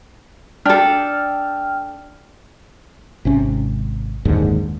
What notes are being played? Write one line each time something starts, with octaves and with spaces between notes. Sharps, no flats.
D4 A4 G5 A5 F6
G#1 C3 C#4
F#1 D#2 G#2 D3